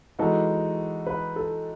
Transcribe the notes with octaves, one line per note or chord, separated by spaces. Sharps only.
E3 G#3 D#4 F#4 A4 B4
B4
A4